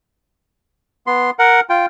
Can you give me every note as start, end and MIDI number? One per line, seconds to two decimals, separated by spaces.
1.07 1.31 59
1.07 1.31 84
1.39 1.60 70
1.39 1.60 78
1.70 1.86 65
1.70 1.86 79